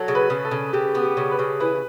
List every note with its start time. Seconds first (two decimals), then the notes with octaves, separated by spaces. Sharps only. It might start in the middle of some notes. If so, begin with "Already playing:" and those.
Already playing: F#3 A4
0.08 C#3
0.15 B4
0.30 C#3
0.45 A4
0.51 C#3
0.73 C#3 G4
0.95 B3
1.02 G4
1.17 C#3
1.31 B4
1.39 C#3
1.60 E3 B4